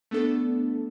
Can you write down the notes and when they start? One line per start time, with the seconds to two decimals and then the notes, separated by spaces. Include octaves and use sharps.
0.11 A3 B3 D4 A4